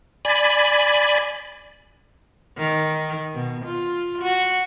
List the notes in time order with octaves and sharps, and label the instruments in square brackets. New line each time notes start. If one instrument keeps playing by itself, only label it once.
[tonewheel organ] D5 G#5 B5
[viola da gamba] D#3
B2
F4
F#4